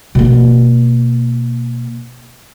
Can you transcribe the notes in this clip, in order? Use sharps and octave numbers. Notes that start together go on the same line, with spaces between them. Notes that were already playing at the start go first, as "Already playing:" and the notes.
B2 A#3